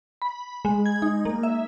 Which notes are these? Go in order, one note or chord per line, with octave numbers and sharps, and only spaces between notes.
B5
G#3
G#6
D#4
A#3
E5